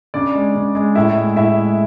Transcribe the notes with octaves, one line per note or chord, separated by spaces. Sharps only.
C#3 D4 D5
G#3
C#3
G#3
A2 E4 E5
G#3
A2 E4 E5
G#3